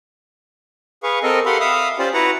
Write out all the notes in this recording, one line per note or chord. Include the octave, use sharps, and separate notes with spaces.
G#4 B4 F5 C#6
C4 A4 A#4 D#5
G4 A4 F5 F#5 B5 C6
E5 F5 B5 D#6
C#4 F4 G4 C5 D5
E4 F#4 B4 F#5 A#5